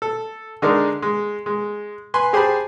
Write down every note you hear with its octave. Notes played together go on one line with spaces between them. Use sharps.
A4
D3 G#3 D4 D#4 A#4
G#3
G#3
B4 G#5 C6
G4 G#4 C5 G#5 A5 B5